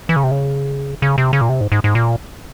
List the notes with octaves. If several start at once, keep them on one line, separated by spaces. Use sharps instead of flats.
E3
C#3
C3
C#3
C#3
C3
C#3
A#2
C3
G#2
G#2
G#2
A#2